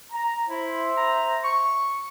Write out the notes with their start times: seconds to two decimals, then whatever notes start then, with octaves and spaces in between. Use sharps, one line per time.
0.11 A#5
0.49 E4 C5 E5
0.97 A#5
1.44 C#6